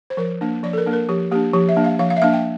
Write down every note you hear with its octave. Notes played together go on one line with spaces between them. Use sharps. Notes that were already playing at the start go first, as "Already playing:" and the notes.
C5
F3 A#4
A#3 D4
F3 D5
A4
A#4
A#3 D4
A#4
F3 G4
A#3 D4 G4
F3 G4
E5
A#3 D4
F5
F3 F5
F5
E5
A#3 D4 F5
G5